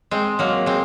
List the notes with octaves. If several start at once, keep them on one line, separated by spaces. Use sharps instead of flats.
G#3 C4
F#3 A#3
G#3 C4